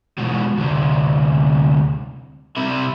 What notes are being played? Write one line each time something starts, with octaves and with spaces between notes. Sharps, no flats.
G#2 B2
D2 C3
C3 E4